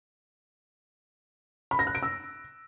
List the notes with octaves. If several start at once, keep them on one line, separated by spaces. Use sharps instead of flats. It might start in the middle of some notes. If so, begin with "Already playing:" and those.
B5
A#6
F#6
D7
E6